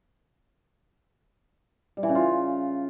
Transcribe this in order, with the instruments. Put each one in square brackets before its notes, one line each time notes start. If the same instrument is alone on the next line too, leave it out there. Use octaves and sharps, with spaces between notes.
[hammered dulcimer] G3
E3
C#3
F4